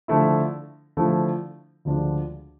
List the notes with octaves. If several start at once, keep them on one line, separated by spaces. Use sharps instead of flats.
D3 F3 A3 E4
D3 F3 A3 E4
D2 D3 F3 G#3 D4